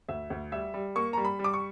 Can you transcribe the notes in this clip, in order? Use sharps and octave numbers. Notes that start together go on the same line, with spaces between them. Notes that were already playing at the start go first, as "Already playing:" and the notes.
D2 E5
D2
G3 E5
G3
A#3 C#6
G3 A#5
B5
G3
D6
C#6